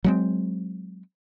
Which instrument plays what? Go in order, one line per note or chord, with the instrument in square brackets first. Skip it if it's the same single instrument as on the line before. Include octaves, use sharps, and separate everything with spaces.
[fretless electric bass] F#3 G#3 C4